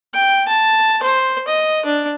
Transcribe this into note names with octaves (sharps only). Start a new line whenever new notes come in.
G5
A5
C5
D#5
D4